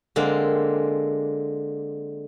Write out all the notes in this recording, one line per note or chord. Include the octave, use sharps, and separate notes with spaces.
D3 G#3 A#3 C4